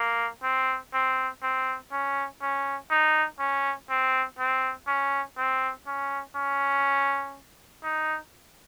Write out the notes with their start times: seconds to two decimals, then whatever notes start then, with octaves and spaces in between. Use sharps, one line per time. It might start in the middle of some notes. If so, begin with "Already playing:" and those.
Already playing: A#3
0.43 C4
0.94 C4
1.43 C4
1.92 C#4
2.42 C#4
2.91 D#4
3.39 C#4
3.90 C4
4.39 C4
4.87 C#4
5.37 C4
5.87 C#4
6.36 C#4
7.84 D#4